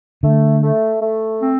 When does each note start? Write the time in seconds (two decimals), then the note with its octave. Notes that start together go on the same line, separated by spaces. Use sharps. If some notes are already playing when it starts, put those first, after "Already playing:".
0.23 D3 A3
0.63 A3
1.02 A3
1.41 C4